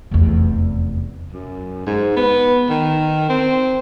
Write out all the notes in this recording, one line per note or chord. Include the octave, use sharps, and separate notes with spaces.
F1 E2
F#2
G#2
B3
D#3
C4